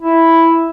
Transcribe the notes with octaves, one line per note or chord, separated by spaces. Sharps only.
E4